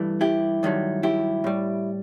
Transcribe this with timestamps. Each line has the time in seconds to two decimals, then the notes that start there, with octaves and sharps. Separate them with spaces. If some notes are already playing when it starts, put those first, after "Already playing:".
Already playing: G2 E3 A3
0.21 E4 G4
0.63 G2 D#3 F#3 A3
1.03 E4 G4
1.44 A2 G3